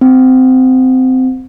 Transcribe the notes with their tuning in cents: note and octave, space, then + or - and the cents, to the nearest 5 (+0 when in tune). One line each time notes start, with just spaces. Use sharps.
C4 -20